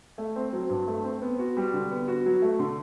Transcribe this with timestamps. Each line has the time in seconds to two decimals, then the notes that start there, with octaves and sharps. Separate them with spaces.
0.18 A3
0.36 C4
0.53 F#3
0.69 G2
0.87 A3
1.04 C4
1.21 B3
1.39 F#4
1.57 G3
1.73 D3
1.91 B3
2.08 F#4
2.26 F#3
2.42 A3
2.59 D3